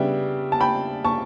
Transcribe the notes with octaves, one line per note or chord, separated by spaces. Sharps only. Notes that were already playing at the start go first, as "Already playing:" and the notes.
Already playing: C#3 G3 B3 D4 E5 G5
A5
G5 B5
A5 C#6